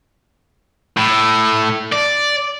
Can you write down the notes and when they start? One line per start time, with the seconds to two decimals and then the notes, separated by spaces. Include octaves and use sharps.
0.97 A2
1.92 D5